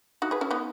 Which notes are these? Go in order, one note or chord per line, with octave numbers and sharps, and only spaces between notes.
D#4 F#4
G#4 B4
C#4 E4
B3 D#4